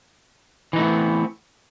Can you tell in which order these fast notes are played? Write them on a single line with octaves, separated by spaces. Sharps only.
E3 D#4 A3 B3 C4